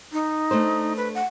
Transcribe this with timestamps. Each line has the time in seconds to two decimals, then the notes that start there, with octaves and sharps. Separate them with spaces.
0.12 D#4
0.51 A3 D4 C5
0.97 B4
1.15 F#5